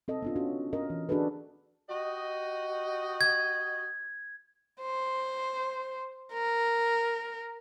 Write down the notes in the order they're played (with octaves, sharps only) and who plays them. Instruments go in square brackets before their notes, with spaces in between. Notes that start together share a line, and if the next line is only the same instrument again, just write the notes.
[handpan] C4 A4 D#5
B3 D4 F4
C#4 F#4
C#4 A#4 D#5
E3
D4 F#4 G#4 A4 B4
[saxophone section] F#4 G4 D#5
[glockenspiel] G#6
[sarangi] C5
A#4